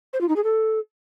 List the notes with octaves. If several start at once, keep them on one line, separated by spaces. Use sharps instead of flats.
C5
F4
D#4
G#4
A4